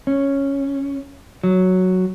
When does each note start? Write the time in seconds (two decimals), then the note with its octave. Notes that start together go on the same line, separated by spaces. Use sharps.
0.07 C#4
1.44 F#3